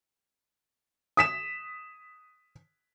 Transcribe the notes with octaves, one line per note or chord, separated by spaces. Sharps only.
D#6 B6 E7